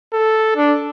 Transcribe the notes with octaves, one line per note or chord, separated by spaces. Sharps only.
A4
D4